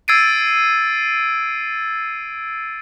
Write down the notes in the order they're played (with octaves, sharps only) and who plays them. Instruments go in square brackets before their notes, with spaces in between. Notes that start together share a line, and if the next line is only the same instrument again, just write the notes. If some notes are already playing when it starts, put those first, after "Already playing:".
[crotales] E6 G#6 A6 C7 D7 D#7